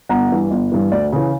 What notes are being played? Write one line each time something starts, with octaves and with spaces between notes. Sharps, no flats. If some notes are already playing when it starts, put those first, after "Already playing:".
G1 F#5 A#5
G2 E3
G1
G2 E3
D2 D5
C#3 E3